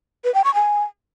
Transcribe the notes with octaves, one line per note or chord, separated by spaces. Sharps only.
B4
G5
C#6
G#5